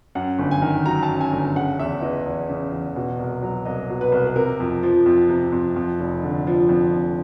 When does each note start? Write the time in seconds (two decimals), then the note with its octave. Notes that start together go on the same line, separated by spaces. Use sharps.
0.15 F#2 F#5
0.39 G1
0.51 G#5
0.62 D#3
0.86 F#3 A#5
1.03 A5
1.08 F#2
1.21 G#5
1.33 G1
1.55 C#3 F#5
1.79 E2 E5
2.02 E3 D#5
2.26 E2
2.49 C#3
2.72 E2
2.96 B2
3.19 C2
3.43 F#3
3.65 C2 D#5
3.90 B2
4.01 B4
4.12 C2
4.27 B4
4.36 C3 A#4
4.60 F2
4.83 F3
5.06 F2
5.30 C3
5.52 F2
5.76 F2
6.00 F1
6.23 D3
6.47 F3
6.69 F2
6.93 F1